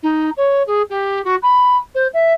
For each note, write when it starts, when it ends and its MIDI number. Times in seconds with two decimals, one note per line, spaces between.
0.03 0.30 63
0.37 0.63 73
0.67 0.82 68
0.90 1.24 67
1.24 1.36 66
1.43 1.77 83
1.95 2.07 72
2.14 2.33 76